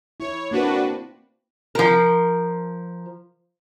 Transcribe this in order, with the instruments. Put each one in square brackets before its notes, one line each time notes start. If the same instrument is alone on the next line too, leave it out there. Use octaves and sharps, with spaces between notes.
[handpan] E4 [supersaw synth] C#5
[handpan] A#3 C4 [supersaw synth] D4 F#4 B4
[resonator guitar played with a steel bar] F3 A#4